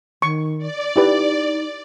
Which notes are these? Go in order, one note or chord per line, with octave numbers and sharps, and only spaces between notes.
D#3 C#6
D5
D#4 E4 G4 B4